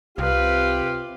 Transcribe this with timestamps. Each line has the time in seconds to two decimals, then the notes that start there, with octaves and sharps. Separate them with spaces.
0.18 C2 C3 F4 G4 B4 F5